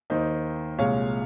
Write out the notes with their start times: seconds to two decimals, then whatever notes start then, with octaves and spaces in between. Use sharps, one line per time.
0.10 D#2 D#3 A#3 C5 D#5
0.78 C2 A#2 G#3 C#5 F5